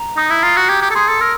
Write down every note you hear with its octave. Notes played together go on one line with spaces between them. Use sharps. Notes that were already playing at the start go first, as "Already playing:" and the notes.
Already playing: A#5
D#4 D#6
E4
F4 A#5
F#4
G4 G#6
G4
A4
G#4 C6
A4
A#4 E6